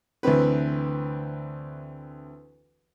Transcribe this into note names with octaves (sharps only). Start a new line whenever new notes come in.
D2 E3 C4 B4